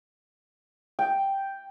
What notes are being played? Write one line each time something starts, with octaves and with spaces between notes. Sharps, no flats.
G5